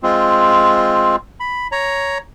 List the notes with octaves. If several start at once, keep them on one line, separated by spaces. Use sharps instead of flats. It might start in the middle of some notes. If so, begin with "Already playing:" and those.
G#3 C4 F4
B5
C#5 A#5